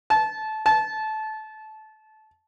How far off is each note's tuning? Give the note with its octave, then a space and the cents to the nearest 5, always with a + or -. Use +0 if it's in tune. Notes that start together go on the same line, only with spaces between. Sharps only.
A5 -20
A5 -20